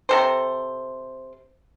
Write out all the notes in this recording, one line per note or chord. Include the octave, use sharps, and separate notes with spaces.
C3 A4 C5